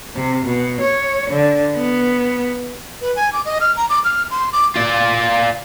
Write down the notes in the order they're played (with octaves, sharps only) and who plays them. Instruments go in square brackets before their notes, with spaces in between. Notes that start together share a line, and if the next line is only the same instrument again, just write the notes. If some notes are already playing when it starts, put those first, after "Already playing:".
[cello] C3
B2
C#5
D3
B3
[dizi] B4
G#5
D6
D#5
F6
A#5
D6
F6
C6
D6
[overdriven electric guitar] F4 D5